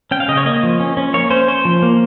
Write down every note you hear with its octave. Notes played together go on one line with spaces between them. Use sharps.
C#4 G5
F5
C#3 D#5
C#5
A#3 D#5
F3
C#4
C#4
A#3 C#5
C#4 C5
C#4 C5
F3
A#3